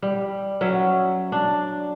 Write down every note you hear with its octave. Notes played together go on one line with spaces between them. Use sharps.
G3
F#3 C#4 E5
D4